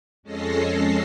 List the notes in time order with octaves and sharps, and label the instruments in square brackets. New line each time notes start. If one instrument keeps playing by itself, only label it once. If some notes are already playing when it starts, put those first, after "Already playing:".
[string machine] F2 G#3 C#4 A4 A#6 C7